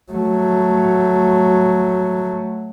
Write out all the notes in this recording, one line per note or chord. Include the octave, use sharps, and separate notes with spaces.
F#3 A3